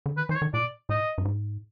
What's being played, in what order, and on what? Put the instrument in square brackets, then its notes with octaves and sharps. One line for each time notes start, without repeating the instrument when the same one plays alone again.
[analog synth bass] D3
[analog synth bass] D#3 [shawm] B4
[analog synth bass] E3 [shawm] C5
[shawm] C#5
[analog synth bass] D#3
[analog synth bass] A#2 [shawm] D5
[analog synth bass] A2 [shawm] D#5
[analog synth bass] G2
G#2